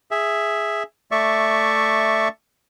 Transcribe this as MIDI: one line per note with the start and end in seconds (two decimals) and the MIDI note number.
0.11 0.83 68
0.11 0.83 76
1.11 2.28 57
1.11 2.28 74
1.11 2.28 76
1.11 2.28 85